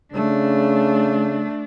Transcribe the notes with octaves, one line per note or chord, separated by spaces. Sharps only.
C#3 A3 D4